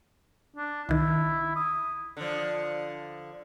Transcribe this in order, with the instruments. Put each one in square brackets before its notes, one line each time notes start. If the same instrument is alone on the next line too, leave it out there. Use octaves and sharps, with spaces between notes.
[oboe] D4
[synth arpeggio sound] C2 D#3 [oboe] E4
[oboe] D#6
[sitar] D3 F3